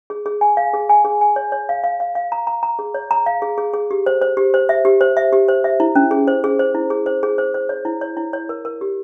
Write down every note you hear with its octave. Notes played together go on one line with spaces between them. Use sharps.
G#4
G#4
G#5
F5
G#4
G#5
G#4
G#5
C#5
C#5
F5
F5
F5
F5
A#5
A#5
A#5
G#4
C#5
A#5
F5
G#4
G#4
G#4
G4
C5
C5
G4
C5
E5
G4
C5
E5
G4
C5
E5
E4
C#4
G#4
C5
G#4
C5
E4
G#4
C5
G#4
C5
C5
C#5
E4
C#5
E4
C#5
A#4
A#4
G4